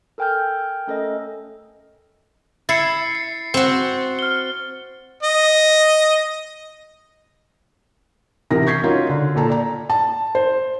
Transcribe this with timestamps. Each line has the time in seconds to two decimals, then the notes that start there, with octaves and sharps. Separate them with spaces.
0.18 A4 A#4 G5 G#5 F6 G6
0.87 A3 C#4 A4 A#4 D#5
2.69 E4 A6 C7 C#7
3.15 C7
3.54 C4 F#4
4.19 F6 G7
5.23 D#5
8.51 A1 C3 E4 A#4 A#6
8.66 C#6 G6 G#6 B6 C7
8.84 C#4 D#4 F4 F#4 A#4
9.09 D3
9.36 A#2 A4 A5 A#5
9.50 D5 A#5
9.90 A5
10.35 C5